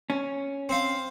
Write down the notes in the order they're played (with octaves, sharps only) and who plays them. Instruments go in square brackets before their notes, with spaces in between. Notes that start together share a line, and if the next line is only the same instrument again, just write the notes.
[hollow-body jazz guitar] C#4
[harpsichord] C4 F5